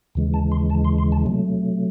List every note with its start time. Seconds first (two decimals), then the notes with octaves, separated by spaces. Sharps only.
0.15 D#2 C#3 E3 G#3
0.34 A5
0.52 C6
0.70 A5
0.84 C6
0.98 C6
1.12 A5
1.26 C3 F#3 A3